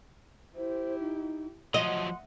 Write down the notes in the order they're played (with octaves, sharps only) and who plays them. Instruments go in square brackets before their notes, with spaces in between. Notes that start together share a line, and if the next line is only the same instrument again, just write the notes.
[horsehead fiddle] E4 G4 [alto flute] C5
[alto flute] D#4
[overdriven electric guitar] F3 F#3 [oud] D#5 [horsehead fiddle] F#5 [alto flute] C6